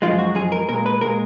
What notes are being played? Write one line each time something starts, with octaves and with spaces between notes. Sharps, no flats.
F#2 F3 G#3 F4
F#4
F#2 F3 G#3 G#4
A#4
A#2 G#3 A#4
B4
A#2 G#3 A#4